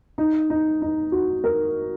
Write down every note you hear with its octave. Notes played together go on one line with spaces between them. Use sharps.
D#4
D#4
D#4
F#4
A#4